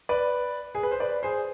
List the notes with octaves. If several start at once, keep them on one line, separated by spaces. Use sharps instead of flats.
B4 D5
G#4
B4
C5
B4 D5
G#4 C5